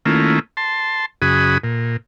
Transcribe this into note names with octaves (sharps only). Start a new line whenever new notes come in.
D#3 A3 A#3 C#4 E4 F4
A5 C6
F#2 C#3 F#4 G#4 B5 D#6
A#2